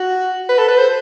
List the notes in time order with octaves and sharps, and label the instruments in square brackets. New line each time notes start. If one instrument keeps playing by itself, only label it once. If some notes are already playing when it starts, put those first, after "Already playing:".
Already playing: [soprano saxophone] F#4
B4
A4
B4
C5